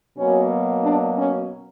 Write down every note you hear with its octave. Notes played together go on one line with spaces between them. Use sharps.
B2 F#3 A#3 C#4
D4
C#4